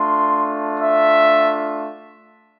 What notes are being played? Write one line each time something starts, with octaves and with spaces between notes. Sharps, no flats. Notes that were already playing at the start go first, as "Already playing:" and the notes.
Already playing: A3 D4 F4 C6
E5